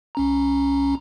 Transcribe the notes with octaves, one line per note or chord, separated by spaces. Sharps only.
C2 C#4 A#5